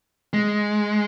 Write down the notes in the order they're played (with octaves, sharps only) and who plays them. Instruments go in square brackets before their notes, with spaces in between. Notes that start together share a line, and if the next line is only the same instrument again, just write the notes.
[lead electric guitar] G#3